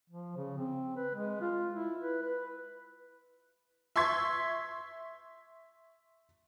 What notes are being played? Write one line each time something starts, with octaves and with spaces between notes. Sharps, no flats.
F3
C#3
C4
B4
G#3
F4
E4
B4
B4
E5 C6 C#6 G#6 B6